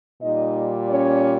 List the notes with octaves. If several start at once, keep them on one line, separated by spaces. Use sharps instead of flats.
A#2 G3 D#4 D#5
C#4 C#5